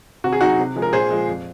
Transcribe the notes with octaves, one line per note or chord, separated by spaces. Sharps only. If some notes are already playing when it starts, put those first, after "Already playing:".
C3 F#4
G#4
F#3 D#4 F#4
C3
F3 G#3
A#4
A#2 G#4 C5
F3 G#3
F2